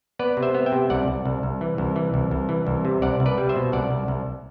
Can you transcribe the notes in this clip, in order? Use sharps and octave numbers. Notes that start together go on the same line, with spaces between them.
B3 B4 D5
C3
C5 E5
B3
E5 G5
C3
C2 D5 F#5
C2
C2
C2
E3
C2
E3
C2
C2
E3
C2
C3
C2 D5 F#5
C2
B4 D5
G3
C5 E5
B2
C2 D5 F#5
C2
C2